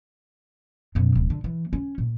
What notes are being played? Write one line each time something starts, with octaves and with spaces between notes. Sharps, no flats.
F#2 B2
D1
D3
E3
C#4
A#2